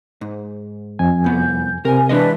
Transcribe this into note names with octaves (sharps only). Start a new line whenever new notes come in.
G#2
F2 G#5
C2 B3 G6
C3 A#4 G#5
E3 G#3 D4 B4 D#5